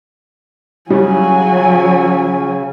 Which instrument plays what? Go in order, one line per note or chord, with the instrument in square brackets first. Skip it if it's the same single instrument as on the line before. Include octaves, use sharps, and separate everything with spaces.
[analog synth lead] C#3 [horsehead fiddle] F#3 G#5 [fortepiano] G3